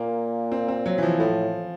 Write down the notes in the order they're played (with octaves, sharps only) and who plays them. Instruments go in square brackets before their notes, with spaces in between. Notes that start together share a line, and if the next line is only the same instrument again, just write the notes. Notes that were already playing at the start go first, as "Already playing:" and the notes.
Already playing: [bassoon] A#2 [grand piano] A#3
[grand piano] C4
C4
F#3
E3
F3
[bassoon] A2 [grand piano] F3